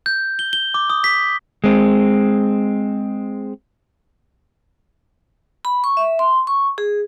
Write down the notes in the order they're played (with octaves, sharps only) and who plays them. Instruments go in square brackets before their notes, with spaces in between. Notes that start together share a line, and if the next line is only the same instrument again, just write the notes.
[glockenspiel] G6
G7
G7
D6
D#6
B6
[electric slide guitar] G#3 C4
[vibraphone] B5
C#6
E5
C6
C#6
G#4